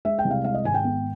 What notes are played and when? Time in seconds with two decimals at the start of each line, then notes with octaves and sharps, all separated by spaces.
0.05 G#3 E5
0.19 G5
0.25 C2
0.31 F5
0.44 G#3 F5
0.54 D#5
0.64 G#1 G#5
0.74 G5
0.84 B3